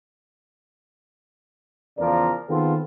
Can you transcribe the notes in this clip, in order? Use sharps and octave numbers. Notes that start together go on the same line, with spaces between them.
E2 C#3 F3 A#4 D5
D#3 B3 C4 F4 G#4 A4